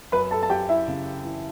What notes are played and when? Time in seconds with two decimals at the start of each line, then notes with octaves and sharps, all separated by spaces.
0.12 F#2 B4 B5
0.31 A4 A5
0.43 A5
0.50 F#2 G4 G5
0.69 E4 E5
0.88 C#3
1.25 E3